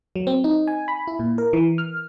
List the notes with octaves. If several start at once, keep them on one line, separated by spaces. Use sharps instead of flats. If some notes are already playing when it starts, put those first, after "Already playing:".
F#3
C4
D#4
G#5
B5
E4
A#2
A#4
E3
F6